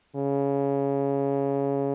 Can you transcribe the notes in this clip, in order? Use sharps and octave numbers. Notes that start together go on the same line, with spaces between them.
C#3